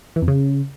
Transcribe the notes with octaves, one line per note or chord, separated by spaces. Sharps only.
E3
F2
C#3